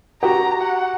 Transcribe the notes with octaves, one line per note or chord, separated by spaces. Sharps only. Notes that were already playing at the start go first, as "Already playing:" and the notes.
F#4 G4 A#5
F#5